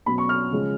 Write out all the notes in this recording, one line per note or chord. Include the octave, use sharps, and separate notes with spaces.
B2 F#3 C#4 B5
C#6
F6
C#3 F3 G#3